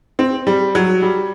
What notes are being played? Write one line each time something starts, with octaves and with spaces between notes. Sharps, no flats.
C4
G3
F#3
G3